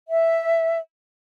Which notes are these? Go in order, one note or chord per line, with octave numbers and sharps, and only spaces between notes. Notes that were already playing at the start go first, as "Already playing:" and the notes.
E5